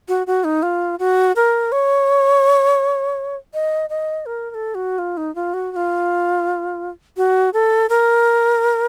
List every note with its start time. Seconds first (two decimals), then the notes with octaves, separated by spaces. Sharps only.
0.08 F#4
0.27 F#4
0.44 D#4
0.63 F4
0.99 F#4
1.36 A#4
1.72 C#5
3.54 D#5
3.90 D#5
4.26 A#4
4.50 A#4
4.54 A4
4.75 F#4
4.98 F4
5.17 D#4
5.35 F4
5.54 F#4
5.72 F#4
5.76 F4
7.17 F#4
7.53 A4
7.89 A#4